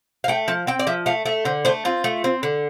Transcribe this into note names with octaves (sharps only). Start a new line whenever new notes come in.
F5
A3 G5
F3 A5
C4 G5
D5
F3 E5
A3 F5
A3 E5
D3 C5
A3 C5
C4 F4
A3
C4
D3